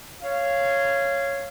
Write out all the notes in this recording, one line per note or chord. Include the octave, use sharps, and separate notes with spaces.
C#5 F5